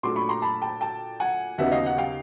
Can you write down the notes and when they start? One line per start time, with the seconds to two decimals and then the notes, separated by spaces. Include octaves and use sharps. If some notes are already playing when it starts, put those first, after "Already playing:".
0.03 A#2 F#3 A3 D4 C6 D6
0.16 B5 C#6
0.29 A#5 C6
0.42 A5 B5
0.62 G5 A5
0.81 G5 A5
1.20 F#5 G#5
1.58 D#2 C#3 F#3 B3 D#4 E5 F#5
1.71 D#5 F5
1.86 F#5
1.98 F5 G5